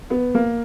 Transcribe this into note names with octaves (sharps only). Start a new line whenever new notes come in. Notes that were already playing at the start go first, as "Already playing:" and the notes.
B3
A#3